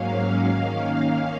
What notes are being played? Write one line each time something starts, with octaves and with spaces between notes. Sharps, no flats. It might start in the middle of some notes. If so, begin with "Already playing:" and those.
Already playing: G#2 F#3 A#3 C#4 F5
D#3 A#3 C#4